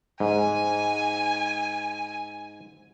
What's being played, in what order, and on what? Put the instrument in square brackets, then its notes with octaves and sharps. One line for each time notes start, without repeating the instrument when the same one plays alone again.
[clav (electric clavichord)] G#2 [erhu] G#5